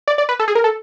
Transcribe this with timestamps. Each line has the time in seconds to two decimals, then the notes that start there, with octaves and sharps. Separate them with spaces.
0.08 D5
0.18 D5
0.29 B4
0.40 A4
0.48 G#4
0.55 A#4
0.64 A4